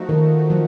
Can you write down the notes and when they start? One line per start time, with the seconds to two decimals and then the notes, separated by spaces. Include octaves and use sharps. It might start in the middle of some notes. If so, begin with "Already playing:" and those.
Already playing: F3 A3 D#4 F#4
0.09 D#3
0.50 F3